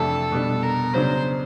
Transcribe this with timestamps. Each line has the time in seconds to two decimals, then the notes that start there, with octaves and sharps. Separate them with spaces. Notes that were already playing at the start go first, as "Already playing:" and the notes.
Already playing: F2 C3 E3 A3 D4 A4
0.32 B2 G3 B3 D4
0.62 A#4
0.93 C#3 F#3 B3 D4 C5